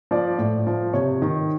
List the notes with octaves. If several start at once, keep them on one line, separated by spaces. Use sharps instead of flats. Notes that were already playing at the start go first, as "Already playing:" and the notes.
F3 D5
A2
F3
C3 C#5
D#3